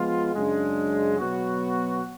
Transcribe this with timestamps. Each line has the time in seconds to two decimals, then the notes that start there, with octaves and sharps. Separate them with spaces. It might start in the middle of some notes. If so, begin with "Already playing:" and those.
Already playing: F3 G#3 B3 F4
0.33 F#2 C#3 G#3 D4
1.19 B2 F#3 B3 F#4